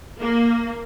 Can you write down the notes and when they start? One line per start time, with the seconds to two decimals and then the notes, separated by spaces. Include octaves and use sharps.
0.20 A#3